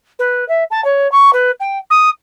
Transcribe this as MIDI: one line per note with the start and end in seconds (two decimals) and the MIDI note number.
0.19 0.47 71
0.48 0.64 76
0.71 0.83 81
0.84 1.10 73
1.12 1.31 85
1.33 1.51 71
1.60 1.78 79
1.90 2.09 87